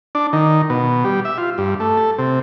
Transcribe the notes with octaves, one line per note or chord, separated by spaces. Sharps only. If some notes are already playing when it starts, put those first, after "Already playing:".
D4
D#3
B2
G3
E5
F4
G2
A3
A4
C3